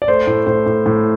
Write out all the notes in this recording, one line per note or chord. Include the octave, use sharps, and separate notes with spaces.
D5
A3 C5
A2
A2 C5
A2
A2